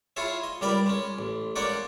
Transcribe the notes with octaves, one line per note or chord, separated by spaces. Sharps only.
E4 F4 G#4 C#5 E5
D#5
C#2 G3 A#4 D5 B5
G#3 C#4
A1
G#3 A#3 C#4 D#4 D5 F#5